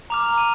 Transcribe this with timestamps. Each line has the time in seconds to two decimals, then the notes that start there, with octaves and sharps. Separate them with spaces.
0.10 A#5 D6 F6 F7
0.26 F7
0.38 D#7